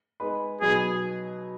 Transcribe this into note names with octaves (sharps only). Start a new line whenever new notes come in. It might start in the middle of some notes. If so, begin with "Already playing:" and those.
G#3 D#4 G#4 B4
B2 F#3 D#4 G#4 B4